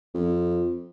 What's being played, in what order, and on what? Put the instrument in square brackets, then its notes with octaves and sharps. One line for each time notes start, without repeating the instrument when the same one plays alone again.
[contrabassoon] F2